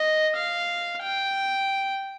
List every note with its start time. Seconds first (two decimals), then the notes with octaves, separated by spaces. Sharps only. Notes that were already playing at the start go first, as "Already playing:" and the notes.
Already playing: D#5
0.36 F5
1.02 G5